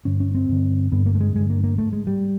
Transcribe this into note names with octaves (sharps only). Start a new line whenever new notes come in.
G2 D3 C#4
C#4
C4
G2 D3
G2 D3 B3
A#3
A3
G#3
G2 D3 G#3
A#3
A#3
G#2 A3
G#3
G3